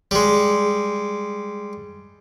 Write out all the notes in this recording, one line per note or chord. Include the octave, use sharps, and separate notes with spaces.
G3 G#3